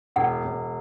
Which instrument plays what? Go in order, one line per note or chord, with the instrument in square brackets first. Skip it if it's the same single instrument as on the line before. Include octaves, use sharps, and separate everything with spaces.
[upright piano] E1 [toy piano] F#5
[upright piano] E1